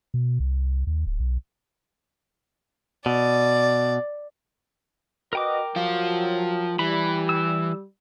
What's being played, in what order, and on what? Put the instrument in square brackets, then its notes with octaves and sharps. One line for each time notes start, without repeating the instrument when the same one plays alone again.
[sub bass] B2
C2
D#2
D1
B1
[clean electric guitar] B2 [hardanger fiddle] D5
[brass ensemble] F#4 B4 D#5 [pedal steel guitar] A#4 G5 D6
[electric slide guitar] F3 F4 [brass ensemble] F#3
[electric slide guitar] E3 [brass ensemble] G3 [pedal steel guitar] B5
[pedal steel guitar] E6